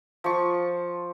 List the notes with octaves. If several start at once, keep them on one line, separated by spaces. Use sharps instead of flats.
F3 C#6